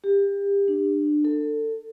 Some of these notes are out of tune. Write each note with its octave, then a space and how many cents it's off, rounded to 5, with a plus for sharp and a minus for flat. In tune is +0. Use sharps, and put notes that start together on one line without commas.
G4 +30
D4 +25
A4 +25